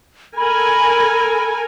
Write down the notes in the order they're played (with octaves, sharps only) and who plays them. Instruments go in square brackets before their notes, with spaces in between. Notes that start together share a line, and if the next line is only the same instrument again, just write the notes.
[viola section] A4 A#4 G#5 [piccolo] B5